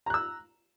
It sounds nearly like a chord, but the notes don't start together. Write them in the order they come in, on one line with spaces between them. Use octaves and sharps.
A#5 F#6 E6